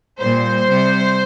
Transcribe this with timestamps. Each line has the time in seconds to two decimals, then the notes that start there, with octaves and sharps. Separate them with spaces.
0.20 A#2 G3 C5
0.67 C3 G3